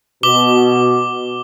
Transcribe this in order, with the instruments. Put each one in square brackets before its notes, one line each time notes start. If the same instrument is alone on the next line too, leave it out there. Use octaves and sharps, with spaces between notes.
[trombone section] B2 [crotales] D6 G7